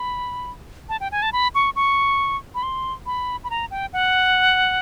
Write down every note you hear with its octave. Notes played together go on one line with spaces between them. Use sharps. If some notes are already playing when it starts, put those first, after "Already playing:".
Already playing: B5
A5
G5
G#5
A5
B5
C#6
C#6
B5
C6
B5
B5
A#5
G5
F#5